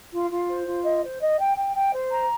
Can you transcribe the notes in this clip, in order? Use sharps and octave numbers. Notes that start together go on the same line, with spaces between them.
F4
F4
C5
F4
D#5
C5
D#5
G5
G5
G5
C5
A#5